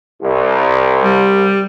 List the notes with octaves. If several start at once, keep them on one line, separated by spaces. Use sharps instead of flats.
C2
G3